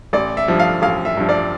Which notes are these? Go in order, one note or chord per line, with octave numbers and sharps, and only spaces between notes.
A1 D5
E5
G2 F3
F5
A1 F5
E5
G2 F3
D5